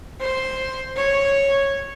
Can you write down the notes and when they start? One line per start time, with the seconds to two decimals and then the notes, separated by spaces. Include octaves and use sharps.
0.20 C5
0.96 C#5